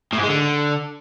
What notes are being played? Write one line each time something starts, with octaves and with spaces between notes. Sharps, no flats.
A2
G#2
G#3
D3